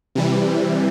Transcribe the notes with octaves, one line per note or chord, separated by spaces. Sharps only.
C3 E3 G3